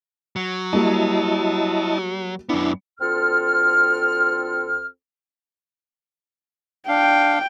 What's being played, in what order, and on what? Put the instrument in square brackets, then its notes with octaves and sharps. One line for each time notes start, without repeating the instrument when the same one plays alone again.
[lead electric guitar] F#3
[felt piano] G3 A#3 F#4 [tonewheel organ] E4 D#5 A5
[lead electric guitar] F#2 B3 [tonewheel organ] D4 E4
[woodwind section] D2 C4 F4 A4 F6
[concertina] D4 F5 [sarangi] G5